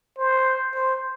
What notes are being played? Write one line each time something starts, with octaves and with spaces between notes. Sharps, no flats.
C5
C5